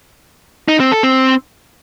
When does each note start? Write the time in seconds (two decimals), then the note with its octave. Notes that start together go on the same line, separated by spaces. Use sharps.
0.68 D#4
0.80 C4
0.92 A4
1.03 C4